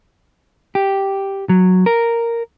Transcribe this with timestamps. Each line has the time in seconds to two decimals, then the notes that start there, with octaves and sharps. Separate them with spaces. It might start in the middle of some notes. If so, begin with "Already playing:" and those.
0.75 G4
1.49 F#3
1.86 A#4